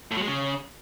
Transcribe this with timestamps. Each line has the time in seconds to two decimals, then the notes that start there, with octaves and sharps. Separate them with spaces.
0.11 A2
0.17 F#3
0.22 G#3
0.27 C#3